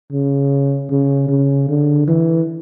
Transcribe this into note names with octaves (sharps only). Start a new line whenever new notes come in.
C#3
C#3
C#3
D3
E3